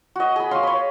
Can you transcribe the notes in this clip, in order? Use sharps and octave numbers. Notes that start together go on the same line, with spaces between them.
F#4 D#5
G#4 B5
C#5 D#5 F5 C6
C#5 B5